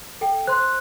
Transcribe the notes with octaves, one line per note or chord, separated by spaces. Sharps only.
A4 G5
C5 C6 F#6